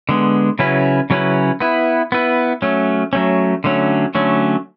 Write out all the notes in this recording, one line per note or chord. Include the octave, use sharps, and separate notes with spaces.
D3 G#3 B3
C#3 F#3 C#4 E4 B4
C#3 F#3 C#4 E4 B4
B3 E4 B4
B3 E4 B4
F#3 A3 C#4
F#3 A3 C#4
D3 F#3 A3 C#4
D3 F#3 A3 C#4